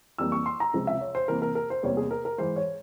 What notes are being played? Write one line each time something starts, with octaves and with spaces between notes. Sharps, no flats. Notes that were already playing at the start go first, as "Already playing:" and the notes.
F2 E3 G3 A#3 E6
C#6
C6
A#5
C#2 C3 F3 G#3
E5
C#5
C5
C2 C3 E3 A#3 A#4
A#4
A#4
C5
E2 C3 G3 A#3 C#5
G#4
A#4
A#4
G#2 E3 G#3 C5
C#5